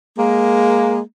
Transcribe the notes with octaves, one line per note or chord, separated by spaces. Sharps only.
G#3 A#3